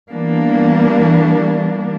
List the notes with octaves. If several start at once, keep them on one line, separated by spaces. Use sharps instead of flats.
E3 G3 A#3 B3 D4